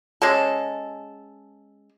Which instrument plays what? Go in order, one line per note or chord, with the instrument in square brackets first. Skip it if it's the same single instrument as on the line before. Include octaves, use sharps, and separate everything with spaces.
[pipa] G#3 C#4 A4